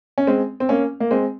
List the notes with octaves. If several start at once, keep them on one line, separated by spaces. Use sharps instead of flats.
C#4
G#3 C4
C4
A#3 C#4
A#3
G#3 C4